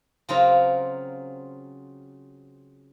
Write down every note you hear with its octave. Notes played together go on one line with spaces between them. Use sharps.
C#3 F#3 C4 F4 F#4 A#4